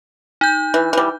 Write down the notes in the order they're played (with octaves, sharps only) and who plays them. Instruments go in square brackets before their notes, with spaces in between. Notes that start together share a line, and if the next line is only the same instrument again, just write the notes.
[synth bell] D#4 G6
[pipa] E3
E3 G3